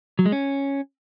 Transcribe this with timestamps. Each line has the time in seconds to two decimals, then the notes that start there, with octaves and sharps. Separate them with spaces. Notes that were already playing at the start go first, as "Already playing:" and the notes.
0.19 F#3
0.26 G#3
0.32 C#4